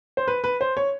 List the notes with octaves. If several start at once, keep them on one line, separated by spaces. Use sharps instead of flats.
C5
B4
B4
C5
C#5